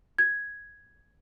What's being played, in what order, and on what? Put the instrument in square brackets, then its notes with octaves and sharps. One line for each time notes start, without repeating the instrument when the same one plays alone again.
[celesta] G#6